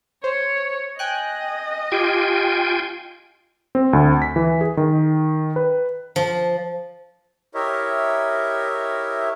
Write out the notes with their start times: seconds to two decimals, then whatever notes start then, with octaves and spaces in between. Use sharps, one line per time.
0.24 C5 C#5
0.99 D#5 G5 G#5 F#6
1.92 F4 G4 G5 G#5
3.75 C4
3.93 D2
4.22 B6
4.36 E3
4.61 G#4
4.77 D#3
5.56 B4
6.16 F3
7.55 E4 G4 A#4 C#5 D#5 E5